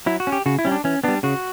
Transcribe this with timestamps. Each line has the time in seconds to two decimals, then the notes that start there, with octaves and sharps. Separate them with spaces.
0.06 F#3 E4
0.20 F#4
0.27 C#4
0.32 G4
0.46 C#3 F#4
0.59 E4
0.65 G3 C#4
0.72 D4
0.84 E3 C#4
1.04 G3 B3 D4
1.23 C#3 F#4